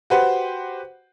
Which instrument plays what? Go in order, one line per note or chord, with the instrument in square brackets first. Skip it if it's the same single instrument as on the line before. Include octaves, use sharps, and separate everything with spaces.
[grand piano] F#4 G4 B4 C5 F#5